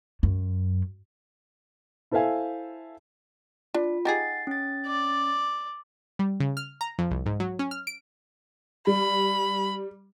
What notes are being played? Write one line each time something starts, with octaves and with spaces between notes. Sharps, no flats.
F#2
E4 A4 C5 E5 F5 G#5
D4 F4
D#4 G4 G#4 F#5 A6 C7
C#4 A6
D5
G3
C#3
F6
A#5
F2
C2
G#2
F#3
C#4
F6
D7
G3 B5